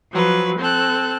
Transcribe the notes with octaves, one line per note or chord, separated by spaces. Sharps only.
F3 F#3 B4
C4 A4 F#6